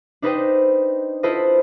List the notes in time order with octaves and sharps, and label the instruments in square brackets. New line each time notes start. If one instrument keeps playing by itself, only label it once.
[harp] D4 D#4 B4 C5 D#5 G5
E4 F4 A4 B4 C5 D#5